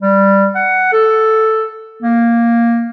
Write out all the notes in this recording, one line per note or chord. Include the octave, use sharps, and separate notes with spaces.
G3
F#5
A4
A#3